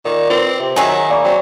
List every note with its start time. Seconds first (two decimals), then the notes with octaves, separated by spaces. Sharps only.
0.05 A#2 D#3
0.30 C4 F4 B4
0.60 C3
0.76 D#3 F#3 F#4 G#4 E5 A#5
1.10 A#3 D5 B5 C#6
1.24 F#3 C4